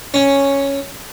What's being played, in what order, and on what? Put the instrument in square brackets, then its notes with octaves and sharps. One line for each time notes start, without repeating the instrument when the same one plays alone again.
[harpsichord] C#4